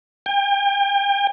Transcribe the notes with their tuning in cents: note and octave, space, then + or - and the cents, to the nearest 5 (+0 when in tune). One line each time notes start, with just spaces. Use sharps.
G5 +40